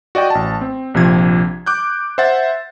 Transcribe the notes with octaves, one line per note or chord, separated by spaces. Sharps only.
F#4 D5 D#5 G5
A1 A5
C4
A#1 C3 F3 G#6
D6 F#6 G6
C5 E5 F#5 A6